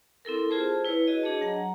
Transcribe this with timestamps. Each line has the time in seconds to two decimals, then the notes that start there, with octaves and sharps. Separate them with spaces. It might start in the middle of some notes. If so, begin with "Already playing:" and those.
0.25 C4 E4 A4 A#4
0.50 F4 G#4 C5 A5
0.84 E4 B4 C#5
1.07 F#4 G#4 D#5
1.23 D4 G#4 C#5 D#5 A5
1.41 F#3 F#5 A#5